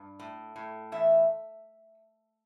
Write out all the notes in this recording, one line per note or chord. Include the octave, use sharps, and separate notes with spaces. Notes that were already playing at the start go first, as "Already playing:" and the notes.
Already playing: G2
A2
A2
E2 E5